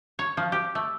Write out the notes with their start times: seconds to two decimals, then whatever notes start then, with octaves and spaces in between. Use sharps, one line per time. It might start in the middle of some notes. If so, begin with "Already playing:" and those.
0.19 C#5
0.37 F3
0.52 G4
0.75 A3